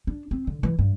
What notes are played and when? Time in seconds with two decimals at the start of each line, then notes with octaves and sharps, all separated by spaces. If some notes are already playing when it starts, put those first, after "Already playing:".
0.07 D4
0.31 C4
0.47 D3
0.63 E3
0.79 G2